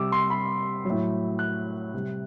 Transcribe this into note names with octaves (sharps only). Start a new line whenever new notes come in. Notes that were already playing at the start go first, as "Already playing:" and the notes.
Already playing: C3 G3 D6 E6
C6
B5
A2 F#3
F#6
C3 G3